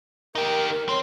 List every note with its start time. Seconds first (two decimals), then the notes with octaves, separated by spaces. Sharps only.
0.35 D#4 G4 A#4
0.89 C4 C#5